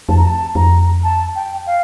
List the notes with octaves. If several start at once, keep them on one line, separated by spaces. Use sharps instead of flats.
F2 A5
A#5
A5
F2 A#5
A5
G5
F5